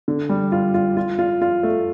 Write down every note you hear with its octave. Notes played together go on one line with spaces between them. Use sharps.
D3
G3
F4
F4
F4
F4
F4
A3